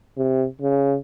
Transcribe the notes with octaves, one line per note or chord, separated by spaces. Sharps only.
C3
C#3